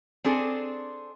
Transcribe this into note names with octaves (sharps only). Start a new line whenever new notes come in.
C4 D4 G#4 A4